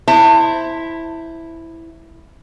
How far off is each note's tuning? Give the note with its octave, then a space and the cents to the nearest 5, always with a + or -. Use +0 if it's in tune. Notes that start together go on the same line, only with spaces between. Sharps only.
E4 +0 C5 +0 A5 +30